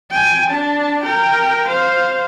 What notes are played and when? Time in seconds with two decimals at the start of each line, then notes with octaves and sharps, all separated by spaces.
0.11 G5 G#5
0.50 D4 A5
1.03 A#4 G5
1.68 C5 F5